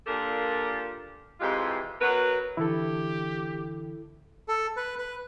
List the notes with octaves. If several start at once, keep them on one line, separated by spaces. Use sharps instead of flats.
A#2 D4 F4 G4 A4 A#4
F2 C3 E3 G#3 F4 G4
B2 F#3 F#4 A#4 B4
D3 E3 E4 G4 A4
A4
B4
B4